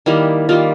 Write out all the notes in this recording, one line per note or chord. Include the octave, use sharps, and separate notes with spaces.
D#3 G3 A#3 E4
D#3 G3 A#3 F4